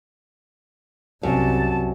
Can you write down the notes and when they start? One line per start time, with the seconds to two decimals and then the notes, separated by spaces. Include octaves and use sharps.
1.23 C2 F#2 A5